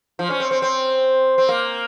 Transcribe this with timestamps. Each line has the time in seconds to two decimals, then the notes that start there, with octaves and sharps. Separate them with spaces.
0.19 F3
0.30 C#4
0.40 C4
0.51 C4
0.62 C4
1.38 C4
1.49 A#3